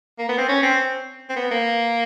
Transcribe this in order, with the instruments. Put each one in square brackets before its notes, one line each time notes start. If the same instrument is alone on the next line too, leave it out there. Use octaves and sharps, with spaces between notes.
[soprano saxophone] A#3
B3
C4
C#4
C4
C4
B3
A#3